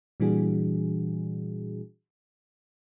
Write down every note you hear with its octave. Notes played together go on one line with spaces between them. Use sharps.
A#2 E3 G3 D4 F#4 G#4